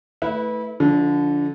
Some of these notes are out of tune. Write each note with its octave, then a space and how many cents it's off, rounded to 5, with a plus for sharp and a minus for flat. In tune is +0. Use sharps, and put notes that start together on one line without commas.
A3 +0 E4 -25 B4 +0
D3 -25 F3 +0 D#4 +20